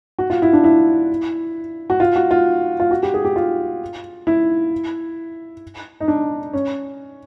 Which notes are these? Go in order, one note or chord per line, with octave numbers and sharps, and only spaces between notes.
F#4
F4
E4
D4
E4
F#4
F4
F#4
F4
F4
F#4
G4
G#4
G4
F4
E4
D#4
D4
C#4